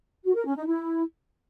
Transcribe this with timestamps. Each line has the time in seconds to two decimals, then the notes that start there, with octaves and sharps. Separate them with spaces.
0.25 F#4
0.35 A#4
0.46 C#4
0.56 D#4
0.67 E4